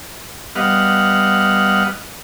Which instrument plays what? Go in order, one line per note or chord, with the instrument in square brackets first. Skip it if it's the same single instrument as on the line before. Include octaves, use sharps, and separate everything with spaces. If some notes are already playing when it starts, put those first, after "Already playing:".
[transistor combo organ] G3 B3 D#5 F5 F#5